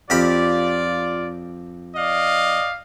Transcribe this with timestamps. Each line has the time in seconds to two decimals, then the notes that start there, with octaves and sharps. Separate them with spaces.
0.10 F2 F4 G4 D5 B5
1.96 D5 D#5 F5